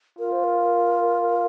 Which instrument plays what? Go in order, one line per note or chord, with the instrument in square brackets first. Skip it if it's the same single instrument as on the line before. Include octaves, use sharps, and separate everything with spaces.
[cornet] F4 [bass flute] A#4
[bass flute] C5
A#4